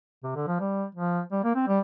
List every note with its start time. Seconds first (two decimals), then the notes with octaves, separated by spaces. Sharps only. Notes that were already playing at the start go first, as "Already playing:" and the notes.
0.23 C3
0.35 D3
0.47 F3
0.60 G3
0.95 F3
1.32 G3
1.44 A#3
1.55 C4
1.67 G3